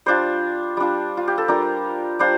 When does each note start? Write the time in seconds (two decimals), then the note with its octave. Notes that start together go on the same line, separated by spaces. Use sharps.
0.06 G3 D4 F4 C5
0.77 G3 D4 F4
1.17 F4
1.28 G4
1.38 A4
1.48 G3 D4 F4 A#4
2.19 G3 D4 F4 C5